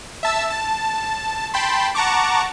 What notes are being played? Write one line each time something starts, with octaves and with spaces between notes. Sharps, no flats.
E5 A5 E6
A5
G5 A5 B5 C6
F#5 A5 A#5 C#6 D6